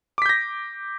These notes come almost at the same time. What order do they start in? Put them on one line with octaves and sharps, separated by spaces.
D6 B6 G6 A#6